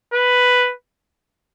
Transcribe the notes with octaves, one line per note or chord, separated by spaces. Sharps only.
B4